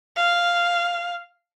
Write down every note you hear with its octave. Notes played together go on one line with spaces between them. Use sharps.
F5